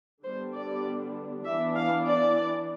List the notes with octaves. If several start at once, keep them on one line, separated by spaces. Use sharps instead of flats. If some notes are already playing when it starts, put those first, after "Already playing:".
D3 G3 B3 D4 C5
D5
E3 B3 D4 E5
F5
D5